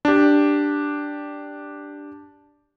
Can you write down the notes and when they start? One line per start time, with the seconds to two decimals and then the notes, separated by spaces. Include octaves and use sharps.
0.05 D4 G4